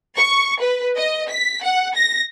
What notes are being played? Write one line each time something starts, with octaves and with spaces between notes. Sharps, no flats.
C#6
B4
D#5
B6
F#5
A#6